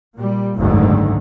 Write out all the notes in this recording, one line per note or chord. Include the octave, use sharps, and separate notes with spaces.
A#2 G3
F#1 D2 G#2 D3 D#3